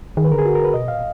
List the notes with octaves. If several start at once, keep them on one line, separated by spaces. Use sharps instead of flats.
D#3 G#4
B4
D3 A#4
G#4
F#4
A#4
B4
B2 D#5
A#2 F5